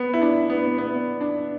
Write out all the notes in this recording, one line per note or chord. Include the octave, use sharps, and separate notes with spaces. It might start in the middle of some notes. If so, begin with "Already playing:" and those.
Already playing: B3
E4
D4
B3
B3
D4